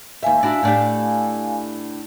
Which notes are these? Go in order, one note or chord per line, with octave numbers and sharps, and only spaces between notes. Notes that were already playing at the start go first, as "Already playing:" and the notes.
D#2 E5 F5 G#5
D4 E4 F#4
A2 D4 G4